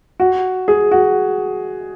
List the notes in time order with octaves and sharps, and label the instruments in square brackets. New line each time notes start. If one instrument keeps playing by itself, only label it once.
[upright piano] F#4
G#4
F#4